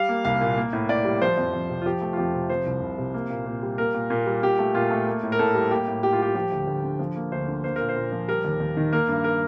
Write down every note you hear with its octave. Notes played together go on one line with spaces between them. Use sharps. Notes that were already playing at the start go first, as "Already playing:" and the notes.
Already playing: G3 F5
A#3
C2 F5
A#2
A#3
A2
A2 D5
G3
F3 C5
F2
F2
C3
F4
F3 G4
A3
F4
F2 G4
C3
F3 C5
C2
C2
C3
A#3
A#2
A#2
G3
A#3 A#4
A#2
A#2
G3
A#2 G4
A3
A#2 F4
A3
A#3
A2
A#4
A2 A4
G3
A#3 G4
A2
A2 G4
F4
G3 G4
F3 G4
D2
D2
D3
F3
A#3
D2 C5
D3
A#3 C5
A#2 A#4
C5
A#2
F3
G3 A#4
D#2
D#2
D#3
A#3 A#4
G2
A#4